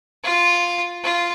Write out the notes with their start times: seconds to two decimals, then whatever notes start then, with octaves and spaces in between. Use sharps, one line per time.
0.24 F4
1.03 F4